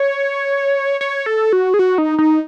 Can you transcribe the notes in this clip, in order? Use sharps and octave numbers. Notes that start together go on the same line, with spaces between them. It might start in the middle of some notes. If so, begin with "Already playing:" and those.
Already playing: C#5
C#5
A4
F#4
G#4
F#4
D#4
D#4